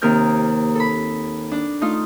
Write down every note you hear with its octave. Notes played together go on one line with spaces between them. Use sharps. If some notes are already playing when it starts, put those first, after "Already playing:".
D#2 C3 A#3 A#4 F6 G6
A4 B5
D4
A3 D#4 F4